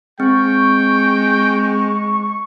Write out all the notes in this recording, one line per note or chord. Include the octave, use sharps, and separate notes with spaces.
G#3 C4 G#4 G5 C#6